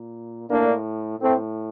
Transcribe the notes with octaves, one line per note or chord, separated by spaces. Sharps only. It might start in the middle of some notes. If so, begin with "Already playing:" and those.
Already playing: A#2
A2 A#3 D4
A2 A3 C4